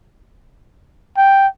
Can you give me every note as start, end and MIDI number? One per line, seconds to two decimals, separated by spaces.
1.17 1.47 79